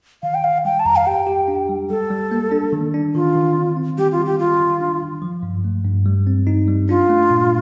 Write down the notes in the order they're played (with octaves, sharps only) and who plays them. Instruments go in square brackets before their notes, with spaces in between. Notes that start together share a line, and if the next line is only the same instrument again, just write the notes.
[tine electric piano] D#3 [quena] F5
[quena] G5
[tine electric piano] D#3 [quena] F5
[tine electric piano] G3 [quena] G5
[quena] A5
[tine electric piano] F2 [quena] A#5
[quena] F5
[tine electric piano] G4 [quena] G5
[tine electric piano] G4
D4
G3
[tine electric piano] G3 [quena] A4
[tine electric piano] G3
A#3
D4
D#3
D4
[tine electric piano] D#3 [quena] F4
[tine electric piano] D#3
C4
C4
[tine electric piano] G3 [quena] G4
[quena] F4
[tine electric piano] G3
[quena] G4
[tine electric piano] D#3 [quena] F4
[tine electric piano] D#3
D4
D#3
F3
G2
A3
G2
G3
C4
D#4
G3
[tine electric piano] D4 [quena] F4
[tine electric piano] A3
A#2